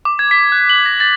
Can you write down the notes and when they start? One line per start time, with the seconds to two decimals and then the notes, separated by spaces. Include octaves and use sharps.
0.05 D6
0.19 G#6
0.31 B6
0.52 F#6
0.70 F#7
0.86 A#6
1.00 A6